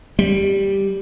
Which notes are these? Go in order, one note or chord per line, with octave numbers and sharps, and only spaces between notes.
G3